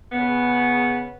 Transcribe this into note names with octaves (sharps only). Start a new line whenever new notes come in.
C#3 B3